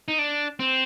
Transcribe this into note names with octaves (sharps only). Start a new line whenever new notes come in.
D#4
D4
C4